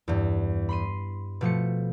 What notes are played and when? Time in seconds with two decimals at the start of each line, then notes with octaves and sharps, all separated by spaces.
0.08 E2 G2
0.69 B5 C6 D#7
1.41 B2 F3 A3 C#7